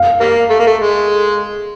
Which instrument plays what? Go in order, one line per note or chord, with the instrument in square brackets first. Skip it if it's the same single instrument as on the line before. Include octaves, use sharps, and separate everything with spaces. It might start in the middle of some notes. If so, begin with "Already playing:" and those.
Already playing: [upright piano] F5
[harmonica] G3 A#3
A3
A#3
A3
G#3